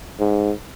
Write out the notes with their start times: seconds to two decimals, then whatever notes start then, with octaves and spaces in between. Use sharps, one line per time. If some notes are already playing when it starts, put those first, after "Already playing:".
0.20 G#2